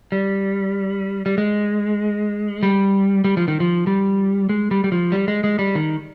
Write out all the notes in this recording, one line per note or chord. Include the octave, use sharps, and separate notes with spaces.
G3
G3
G#3
G3
G3
F3
D#3
F3
G3
G#3
G3
G3
F3
G3
G#3
G#3
G3
D#3